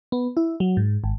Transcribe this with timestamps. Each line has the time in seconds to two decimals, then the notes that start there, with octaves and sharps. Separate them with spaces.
0.12 B3
0.37 E4
0.60 F#3
0.77 G#2
1.04 G#1